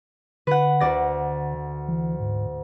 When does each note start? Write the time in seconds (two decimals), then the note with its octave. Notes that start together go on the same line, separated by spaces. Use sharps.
0.47 D3 B4 F#5
0.80 D2 D5 A#6
1.88 E3
2.20 G#2